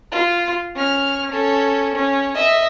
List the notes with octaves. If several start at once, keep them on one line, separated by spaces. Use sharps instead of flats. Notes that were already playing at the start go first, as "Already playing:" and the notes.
F4
C#4 F6
C#4 A4
C#4
D#5 E5